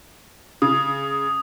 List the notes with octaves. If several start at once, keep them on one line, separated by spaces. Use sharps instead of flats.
C#3 D#6